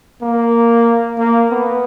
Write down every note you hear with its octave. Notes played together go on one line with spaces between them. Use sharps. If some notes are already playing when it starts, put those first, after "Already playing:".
A#3
A#3
B3